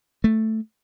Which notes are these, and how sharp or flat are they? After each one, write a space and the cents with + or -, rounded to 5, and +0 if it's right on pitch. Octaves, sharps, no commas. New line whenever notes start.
A3 +0